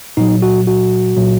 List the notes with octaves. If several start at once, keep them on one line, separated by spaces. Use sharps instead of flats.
A#2 F#3 D#4
F#4
F#4
A#2 F#3